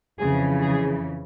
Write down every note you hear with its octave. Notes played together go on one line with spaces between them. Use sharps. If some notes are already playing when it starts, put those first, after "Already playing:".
F2 C#3 E3 G#4
G#4